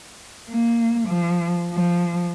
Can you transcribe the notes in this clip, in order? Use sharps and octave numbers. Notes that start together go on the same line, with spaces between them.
A#3
F3
F3